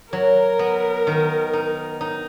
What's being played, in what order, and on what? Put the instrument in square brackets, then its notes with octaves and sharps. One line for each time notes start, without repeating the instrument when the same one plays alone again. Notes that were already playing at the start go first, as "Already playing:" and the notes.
[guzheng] F#3 [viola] A#4
[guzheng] B3
D#3
D#4
D#4